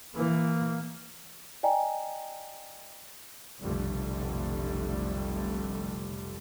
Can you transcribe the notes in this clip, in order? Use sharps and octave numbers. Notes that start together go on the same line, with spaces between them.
E3 A#3
D5 D#5 G5 G#5 A#5
F1 B1 F2 D3 G3 A3